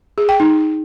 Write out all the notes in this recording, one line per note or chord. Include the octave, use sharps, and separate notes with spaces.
G#4
G5
D#4